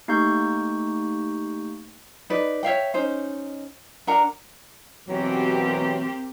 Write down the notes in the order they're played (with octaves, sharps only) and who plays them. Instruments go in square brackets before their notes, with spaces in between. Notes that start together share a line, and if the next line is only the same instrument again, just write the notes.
[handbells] A3 A#3 D#4 G4 C#6 G6
[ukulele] D#4 B4 D5
C#5 E5 F5 G5
C#4 D#4 C5
D4 A#4 F#5 A#5
[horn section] B2 E3 F#3 [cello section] A#3 C4 G4